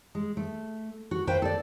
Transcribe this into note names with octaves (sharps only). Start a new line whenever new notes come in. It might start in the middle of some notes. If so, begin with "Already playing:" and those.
G#3
A3
F#4
B4 C5 F5 G5
A4 D5